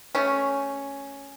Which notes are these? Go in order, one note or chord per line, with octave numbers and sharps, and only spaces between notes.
A3 C#4